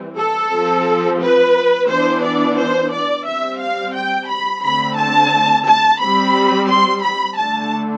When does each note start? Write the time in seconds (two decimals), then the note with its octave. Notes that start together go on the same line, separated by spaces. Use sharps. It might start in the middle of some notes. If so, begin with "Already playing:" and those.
Already playing: E3 G3 C4
0.18 A4
0.52 F3 C4
1.21 B4
1.89 E3 B3 D4 C5
2.24 D5
2.59 C5
2.93 D5
3.27 G3 C4 E5
3.61 F5
3.95 G5
4.30 B5
4.63 D3 A3 C4 B5
4.97 A5
5.67 A5
6.01 G3 C4 B5
6.68 C6
7.03 B5
7.37 D3 A3 D4 A5